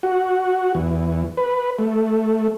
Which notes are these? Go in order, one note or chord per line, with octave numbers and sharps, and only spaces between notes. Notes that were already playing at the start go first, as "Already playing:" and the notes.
F#4
E2
B4
A3